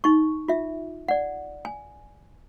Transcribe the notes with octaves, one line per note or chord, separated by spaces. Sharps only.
D#4 C#6
F4 E5
D5 F#5
G#5